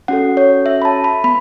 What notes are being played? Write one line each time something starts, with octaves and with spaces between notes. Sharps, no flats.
C#4 F#4 A4 F#5
C#5
E5
B5
A5
B5
B3 B5